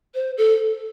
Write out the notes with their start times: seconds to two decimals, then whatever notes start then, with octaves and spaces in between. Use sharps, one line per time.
0.14 C5
0.37 A4